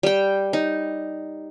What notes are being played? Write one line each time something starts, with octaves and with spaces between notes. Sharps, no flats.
G3 G5
D#4